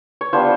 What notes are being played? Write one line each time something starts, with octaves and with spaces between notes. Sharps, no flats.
C#5
G3 B3 D4 F4 C5